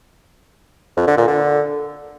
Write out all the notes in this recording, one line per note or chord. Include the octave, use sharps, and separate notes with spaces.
F2
D3
A#2
D3